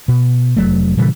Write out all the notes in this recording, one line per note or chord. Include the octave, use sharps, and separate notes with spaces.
B2
F1 F#3 A3
A#2 C#3 E3 G3